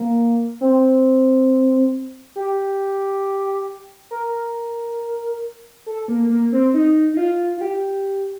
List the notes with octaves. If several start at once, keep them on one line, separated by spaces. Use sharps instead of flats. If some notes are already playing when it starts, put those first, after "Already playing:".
Already playing: A#3
C4
G4
A#4
A4
A#3
A#3
C4
D#4
D#4
F4
F4
G4